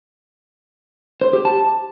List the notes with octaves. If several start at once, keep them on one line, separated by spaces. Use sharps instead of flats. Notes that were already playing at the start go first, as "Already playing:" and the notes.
C5
G4
A5